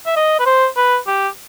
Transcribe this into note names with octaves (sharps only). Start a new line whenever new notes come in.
E5
D#5
B4
C5
B4
G4